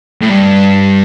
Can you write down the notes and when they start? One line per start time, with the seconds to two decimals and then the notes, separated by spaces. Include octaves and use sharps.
0.22 A2
0.30 G2